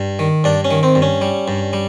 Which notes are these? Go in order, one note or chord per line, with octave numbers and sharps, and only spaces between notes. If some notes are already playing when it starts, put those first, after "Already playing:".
Already playing: G2
D#3
G2 D4
C#4
D#3
C4
G2
C#4
G3
G2
G3